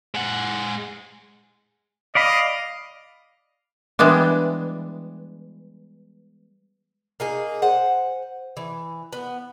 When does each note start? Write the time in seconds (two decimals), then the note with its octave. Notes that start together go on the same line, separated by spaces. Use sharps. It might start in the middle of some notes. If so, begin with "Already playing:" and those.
0.15 G#3 F#5
2.15 D5 D#5 F5 B5
3.99 E3 G3 G#3 B3 D4
7.20 A#3 D#4 G#4
7.62 C5 F#5 G#5
8.57 E3
9.13 B3